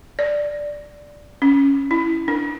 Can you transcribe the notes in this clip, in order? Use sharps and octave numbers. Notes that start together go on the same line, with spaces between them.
D5
C#4
E4
D4